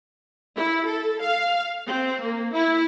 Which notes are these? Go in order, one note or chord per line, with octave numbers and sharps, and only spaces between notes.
E4
A4
F5
C4
A#3
E4